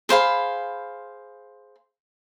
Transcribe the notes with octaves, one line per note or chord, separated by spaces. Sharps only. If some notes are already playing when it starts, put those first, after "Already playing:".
G#4 C5 F5 B5